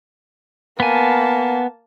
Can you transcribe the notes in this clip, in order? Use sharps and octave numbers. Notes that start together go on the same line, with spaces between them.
A#3 B3 G#5 A5